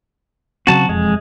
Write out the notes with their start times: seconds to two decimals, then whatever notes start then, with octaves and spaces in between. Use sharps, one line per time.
0.67 C#3 F#3 C4 F#4 A5
0.89 E1 F2 G#3